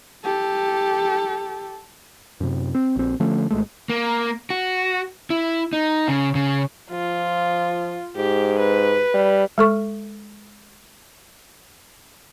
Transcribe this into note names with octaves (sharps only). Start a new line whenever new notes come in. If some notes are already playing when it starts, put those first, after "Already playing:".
G4 A4
F#2 C3
C4
A#1 C4
D3 F3 A3 C#4
G#1 G#3 A3
A#3
F#4
E4
D#4
C#3
C#3
F3 F4
G#2 G4
B4
G3
G#3 A4 C#6